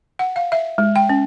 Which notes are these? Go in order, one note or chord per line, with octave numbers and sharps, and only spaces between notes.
F#5
F5
E5
G#3
G5
C#4